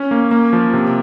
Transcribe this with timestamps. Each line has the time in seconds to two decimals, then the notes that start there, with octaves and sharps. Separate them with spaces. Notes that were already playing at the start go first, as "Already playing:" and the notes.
Already playing: C#4
0.11 A#3
0.31 A#3
0.53 F3
0.73 C3